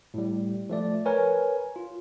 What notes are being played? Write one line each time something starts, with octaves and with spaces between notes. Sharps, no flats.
A2 G3
F3 A3 D5
A#4 B4 C#5 G#5
F4